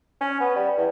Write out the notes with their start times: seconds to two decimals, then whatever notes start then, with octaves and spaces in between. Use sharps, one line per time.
0.21 C#4
0.40 B3
0.56 G3
0.77 E2